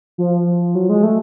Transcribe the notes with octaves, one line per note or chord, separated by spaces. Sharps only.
F3
F#3
G#3
A3